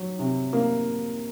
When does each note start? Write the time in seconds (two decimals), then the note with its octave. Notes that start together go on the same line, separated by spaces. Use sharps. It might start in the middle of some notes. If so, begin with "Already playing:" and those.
Already playing: F#3
0.19 C3
0.53 A#3